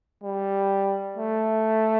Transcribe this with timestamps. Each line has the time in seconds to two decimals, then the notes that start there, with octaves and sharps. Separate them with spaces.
0.23 G3
1.17 A3